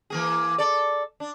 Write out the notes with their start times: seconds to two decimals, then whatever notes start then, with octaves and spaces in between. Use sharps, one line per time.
0.10 E3 A#3 G#4
0.58 A4 D5
1.20 D4